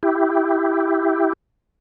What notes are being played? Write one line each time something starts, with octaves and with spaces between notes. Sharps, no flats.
E4 G4